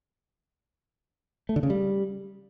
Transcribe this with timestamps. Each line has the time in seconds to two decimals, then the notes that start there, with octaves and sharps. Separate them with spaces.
1.49 A3
1.56 D3
1.63 C#3
1.70 G3